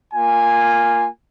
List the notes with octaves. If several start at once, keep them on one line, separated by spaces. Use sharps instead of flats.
A#3 F4 G#5